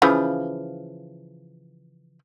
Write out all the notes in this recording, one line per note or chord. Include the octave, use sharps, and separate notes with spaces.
C#3 E3 F3